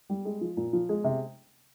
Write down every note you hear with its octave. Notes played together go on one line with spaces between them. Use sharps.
G3
G#3
F3
A#2
F3
G#3
C3